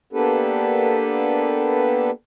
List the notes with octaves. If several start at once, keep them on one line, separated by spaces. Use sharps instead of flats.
A#3 B3 D4 G4 A4 B4